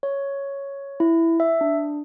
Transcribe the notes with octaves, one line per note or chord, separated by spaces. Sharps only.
C#5
E4
E5
D4